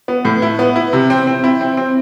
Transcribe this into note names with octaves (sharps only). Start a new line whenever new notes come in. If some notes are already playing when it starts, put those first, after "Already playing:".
B3
A2
E4
B3
E4
C3
C4
C4
E4
C4
C4